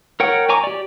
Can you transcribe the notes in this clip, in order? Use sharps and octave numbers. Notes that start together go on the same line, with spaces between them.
A#4 C#5 F#5 G5
C#5 G#5 A#5 C#6 D6
G4 D5